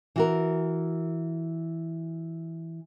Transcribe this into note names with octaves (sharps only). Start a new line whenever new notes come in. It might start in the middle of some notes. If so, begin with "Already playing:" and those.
E3 F#4 A#4